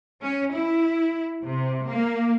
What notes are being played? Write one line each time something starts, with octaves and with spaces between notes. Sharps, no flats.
C#4
E4
C3
A#3